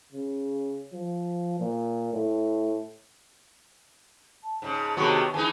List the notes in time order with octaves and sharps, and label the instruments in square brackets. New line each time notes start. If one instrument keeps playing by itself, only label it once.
[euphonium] C#3
F3
A#2
A2
[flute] A5
[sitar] G#2 C#3
[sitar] C3 D#3 G#3 [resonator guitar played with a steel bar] B3 F#4 C#5
[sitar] E3 G#3 D#4 [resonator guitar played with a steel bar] G#5